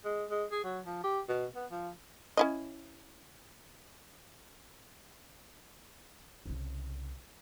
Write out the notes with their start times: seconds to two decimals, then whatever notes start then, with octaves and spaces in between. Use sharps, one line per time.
0.05 G#3
0.30 G#3
0.51 G#4
0.64 F#3
0.86 F3
1.04 G4
1.28 B2
1.55 B3
1.71 F3
2.37 C#4 E4 D#5
6.46 C2 C#3